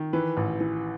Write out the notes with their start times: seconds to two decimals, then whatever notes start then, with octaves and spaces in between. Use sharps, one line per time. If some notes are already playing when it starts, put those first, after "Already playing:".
Already playing: D#3
0.13 E3 B4
0.37 A1
0.60 E3